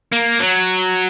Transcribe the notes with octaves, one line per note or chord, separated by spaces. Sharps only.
A#3
F#3